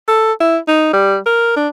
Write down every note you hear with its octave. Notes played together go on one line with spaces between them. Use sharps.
A4
E4
D#4
G3
A#4
D4